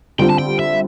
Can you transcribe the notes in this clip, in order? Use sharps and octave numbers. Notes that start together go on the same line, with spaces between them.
D3 G3 C4 F4 G5
A5
G5
E5